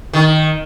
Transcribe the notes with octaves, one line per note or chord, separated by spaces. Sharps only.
D#3